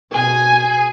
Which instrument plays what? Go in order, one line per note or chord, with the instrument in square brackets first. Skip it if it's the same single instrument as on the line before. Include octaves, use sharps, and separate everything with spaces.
[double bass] B2 [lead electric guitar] G#4 [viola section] G#5